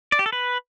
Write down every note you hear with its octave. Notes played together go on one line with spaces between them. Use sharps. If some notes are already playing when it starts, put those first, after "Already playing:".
D5
G4
A4
B4